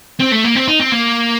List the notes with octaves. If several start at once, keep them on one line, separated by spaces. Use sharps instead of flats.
C4
A3
A#3
C4
D#4
C4
A#3